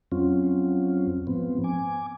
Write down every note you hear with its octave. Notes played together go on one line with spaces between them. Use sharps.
F2 F#3 C4 C#4 F4
G#2 F3 B3 C4
G#5 D6